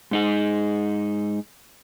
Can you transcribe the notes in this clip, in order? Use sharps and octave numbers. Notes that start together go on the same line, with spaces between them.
G#2 D#4 G#4